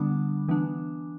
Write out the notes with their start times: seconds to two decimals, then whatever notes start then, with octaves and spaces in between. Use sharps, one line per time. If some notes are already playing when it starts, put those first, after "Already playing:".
Already playing: D3 G3 B3 D4 D6
0.48 E3 B3 D4